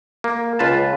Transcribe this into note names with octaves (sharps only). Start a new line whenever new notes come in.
A#3
C#2 F4 B4 A5